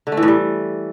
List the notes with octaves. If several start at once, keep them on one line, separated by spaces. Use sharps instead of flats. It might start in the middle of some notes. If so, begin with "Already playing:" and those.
D3
A3
E3
A2
G3